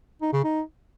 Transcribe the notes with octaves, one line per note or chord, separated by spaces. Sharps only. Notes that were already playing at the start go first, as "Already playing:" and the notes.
D#4
C#3
D#4